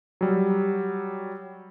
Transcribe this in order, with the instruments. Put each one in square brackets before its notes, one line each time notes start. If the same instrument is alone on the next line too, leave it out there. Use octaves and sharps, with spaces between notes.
[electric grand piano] F#3 G3